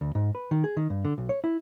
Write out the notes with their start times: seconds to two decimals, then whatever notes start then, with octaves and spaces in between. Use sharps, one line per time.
0.01 D2
0.15 G#2
0.35 B4
0.51 D#3
0.64 G#4
0.77 D#3
0.90 G2
1.05 D3
1.18 B1
1.29 C#5
1.44 E4